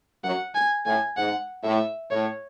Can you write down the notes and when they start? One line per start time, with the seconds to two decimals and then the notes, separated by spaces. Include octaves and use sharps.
0.23 F#2 F#3 F#5
0.55 G#5
0.86 A2 G#5
1.17 G#2 F#5
1.64 A2 E5
2.11 A2 C#5